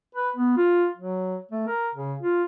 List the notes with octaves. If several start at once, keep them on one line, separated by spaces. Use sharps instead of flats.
B4
B3
F4
F#3
A3
A#4
C#3
F4